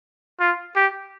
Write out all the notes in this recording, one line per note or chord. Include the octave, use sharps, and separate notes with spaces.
F4
G4